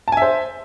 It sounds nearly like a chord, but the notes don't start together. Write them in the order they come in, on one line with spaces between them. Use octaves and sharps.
A5 G#5 E5 C5